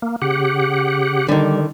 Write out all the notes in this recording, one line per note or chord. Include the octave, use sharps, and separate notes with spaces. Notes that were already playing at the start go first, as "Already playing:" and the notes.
A#3
C#3 G4 F#5
D3 D#3 G3